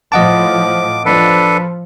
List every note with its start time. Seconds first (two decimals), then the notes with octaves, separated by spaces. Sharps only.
0.12 A2 F3 D#5 F#5 A5 D6
1.06 F3 D4 A4 B4